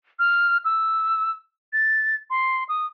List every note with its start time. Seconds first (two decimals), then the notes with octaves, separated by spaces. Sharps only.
0.19 F6
0.65 E6
1.73 A6
2.30 C6
2.69 D#6